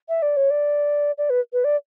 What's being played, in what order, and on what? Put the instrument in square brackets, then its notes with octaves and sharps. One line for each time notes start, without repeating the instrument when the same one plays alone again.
[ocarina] E5
D5
C#5
D5
D5
B4
B4
D5